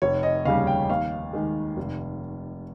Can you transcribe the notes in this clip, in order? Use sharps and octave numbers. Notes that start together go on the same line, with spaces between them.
F1 C#5
D#5
D#2 C#3 G3 F5
G5
D#2 F5
D#3 G#3
F1